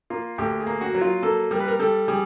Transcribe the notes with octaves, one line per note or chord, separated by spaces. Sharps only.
A#3 F4
D2 G4
G#4
A#3
F#4
F#3
F4
A#3 A4
G3 A#4
B4
A#4
G3 A4
G3 G#4